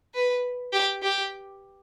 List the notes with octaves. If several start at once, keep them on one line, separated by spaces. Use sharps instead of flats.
B4
G4
G4